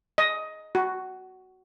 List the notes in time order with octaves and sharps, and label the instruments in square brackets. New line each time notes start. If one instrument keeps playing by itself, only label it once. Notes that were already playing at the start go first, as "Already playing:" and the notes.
[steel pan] D#5
F#4